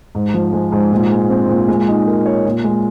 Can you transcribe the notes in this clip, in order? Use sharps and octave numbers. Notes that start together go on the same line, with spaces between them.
G#2
F3
G#3
G#2
A#2
G#3
C4
A#2
G#3
D#4
A#4
C#5
A#2
G#3